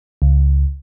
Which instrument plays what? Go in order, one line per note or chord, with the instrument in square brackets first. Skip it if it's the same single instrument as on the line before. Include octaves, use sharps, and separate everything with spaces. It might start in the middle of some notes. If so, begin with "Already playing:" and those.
[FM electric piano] C#2